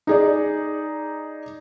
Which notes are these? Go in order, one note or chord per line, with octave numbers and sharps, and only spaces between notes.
D#4 G#4 D5